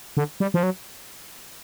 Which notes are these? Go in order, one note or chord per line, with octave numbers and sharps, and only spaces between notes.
D3
G3
F3
F#3